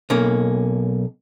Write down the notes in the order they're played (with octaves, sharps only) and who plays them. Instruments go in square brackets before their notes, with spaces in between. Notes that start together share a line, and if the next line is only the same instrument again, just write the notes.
[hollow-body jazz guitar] B1 A#3 C#4